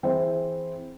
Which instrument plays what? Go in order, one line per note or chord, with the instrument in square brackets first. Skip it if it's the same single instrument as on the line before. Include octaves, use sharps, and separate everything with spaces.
[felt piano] E3 C4 E4 G#4 C5